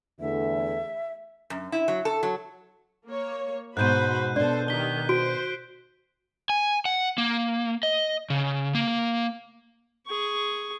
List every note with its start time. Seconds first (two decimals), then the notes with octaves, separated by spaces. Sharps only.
0.20 E2 D3 A3 E5
1.50 F#2
1.72 E4
1.88 F#3
2.05 A4
2.23 F#3
3.07 A#3 C#5
3.77 G#2 B2 F#4 C5 B5 F#6 G6 D#7
4.36 B2 D4 A4 C5 D5
4.68 D#3 G4 B6 G7
5.09 F#4 C5 D7
6.50 G#5
6.85 F#5
7.18 A#3
7.83 D#5
8.30 C#3
8.75 A#3
10.07 G#4 C#6